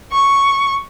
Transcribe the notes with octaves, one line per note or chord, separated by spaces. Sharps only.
C#6